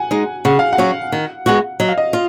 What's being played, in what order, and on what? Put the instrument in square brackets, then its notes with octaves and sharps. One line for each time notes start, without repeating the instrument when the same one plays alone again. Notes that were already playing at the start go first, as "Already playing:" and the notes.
Already playing: [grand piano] F#5 G#5
[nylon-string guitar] G#3 D#4
[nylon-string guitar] C#3 [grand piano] F#5
[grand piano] F5
F#5
[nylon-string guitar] F#3 C#4 F#4
D#3
G#3 B3 F#4
[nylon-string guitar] F#3 [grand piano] D#5
[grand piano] F5
D#5
[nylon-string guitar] F4